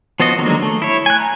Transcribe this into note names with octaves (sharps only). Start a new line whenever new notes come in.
F3 B3 F4 F#4 D#5
D3 D#3 F#3 G#3 A#3
A3
E4 C#5
G#5 F#6
A#5